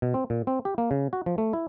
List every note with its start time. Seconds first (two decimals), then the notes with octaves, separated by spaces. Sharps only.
0.02 B2
0.14 C4
0.30 A#2
0.47 C4
0.65 G4
0.78 A#3
0.91 C#3
1.13 F#4
1.26 F3
1.38 A3
1.53 E4